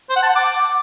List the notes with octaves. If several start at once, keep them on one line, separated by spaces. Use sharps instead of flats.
C5
F#5
A5
F#5
D6